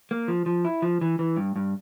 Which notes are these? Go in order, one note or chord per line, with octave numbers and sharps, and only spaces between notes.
A#3
F3
F3
E4
F3
E3
E3
G2
G2